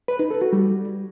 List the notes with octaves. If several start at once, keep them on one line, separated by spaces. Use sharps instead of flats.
B4
D#4
A4
F#4
G3